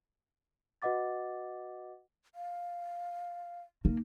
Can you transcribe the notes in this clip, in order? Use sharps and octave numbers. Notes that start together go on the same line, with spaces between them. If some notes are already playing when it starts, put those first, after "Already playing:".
F#4 B4 D#5 F#5 D6 A6
F5
A#3 D#4